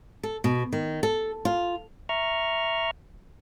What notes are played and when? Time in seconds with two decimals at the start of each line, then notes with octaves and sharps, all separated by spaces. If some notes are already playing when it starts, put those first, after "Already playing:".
0.23 A4
0.44 B2
0.73 D#3
1.03 A4
1.45 F4
2.09 E5 A#5 C#6 F6